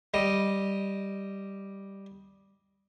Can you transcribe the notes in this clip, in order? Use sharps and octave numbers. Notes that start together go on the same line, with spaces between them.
G3 D#5